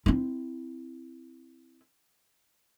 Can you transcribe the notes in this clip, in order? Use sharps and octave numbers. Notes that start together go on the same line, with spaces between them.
C4 E4